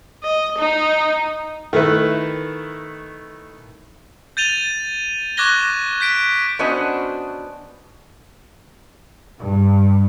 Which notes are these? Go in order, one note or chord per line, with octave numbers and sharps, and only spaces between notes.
D#5
D#4
D#3 A3 E4 B4
G6 A6 D#7 F7 G7
C#6 D6 F#6 G#6 A#6 G7
G6 B6 D7
B3 C#4 D4 F#4 C5 D#5
G2